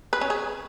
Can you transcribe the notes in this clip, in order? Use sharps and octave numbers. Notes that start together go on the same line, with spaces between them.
B4
C#4
G#4